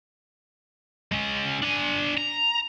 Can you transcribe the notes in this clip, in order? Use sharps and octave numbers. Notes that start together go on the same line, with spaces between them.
G#3 C#4
D4 G#5
A#5